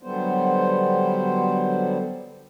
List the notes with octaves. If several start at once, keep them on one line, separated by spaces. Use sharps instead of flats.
D3 F#3 G3 B3 C5